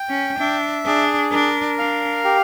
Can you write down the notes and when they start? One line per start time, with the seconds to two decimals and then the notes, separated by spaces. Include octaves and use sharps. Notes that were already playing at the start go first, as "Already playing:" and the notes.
Already playing: G5
0.09 C#4
0.39 D4 E5
0.86 D4 G#4
1.32 D4 A#4
1.78 D4 F5
2.24 G4